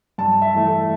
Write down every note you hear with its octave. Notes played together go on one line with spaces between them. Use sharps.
G2 A5
E5
E3 A3
A4